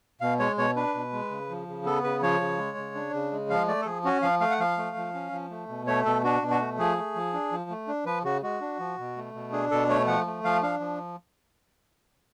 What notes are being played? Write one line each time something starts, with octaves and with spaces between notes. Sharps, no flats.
B2 F5
G#3 C#5
B2 C#5
D4 B4
B2
G#3
C#3
F3
C#3
B3 A4
C#3 B4
F3 C#5
C#3
G#3
C#3
D4
C#3
G#3
F3 F5
A3 D5
A4
F3 G#4
C#4 F#4
F3 F5
A3 F5
F#5
F3 F5
A3
F3
C#4
F3
A3
B2
A3 C#5
B2 A4
D4 F#4
B2
F#4
A3
F3 G#4
A3
F3
D4
F3
A3
D4
F3 B4
C#3 F#4
G#3 F#4
D4
F3
B2
A3
B2
D4 G#4
B2 A4
A3 C#5
F3 F#5
A3
F3 F5
D4 F5
F3